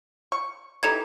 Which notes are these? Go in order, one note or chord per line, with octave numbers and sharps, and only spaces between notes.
C#6
E3 D#4 G4 A4 A#5 G#6